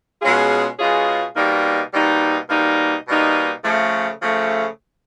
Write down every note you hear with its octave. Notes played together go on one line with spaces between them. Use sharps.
B2 G#3 C#4 F4 G#4
B2 G#3 C#4 F4 G#4
B2 G3 A#3 D#4
B2 G3 A#3 D#4
B2 G3 A#3 D#4
B2 G3 A#3 D#4
C#3 F3 A3
C#3 F3 A3